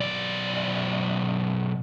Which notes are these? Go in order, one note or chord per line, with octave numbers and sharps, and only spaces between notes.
B1 D5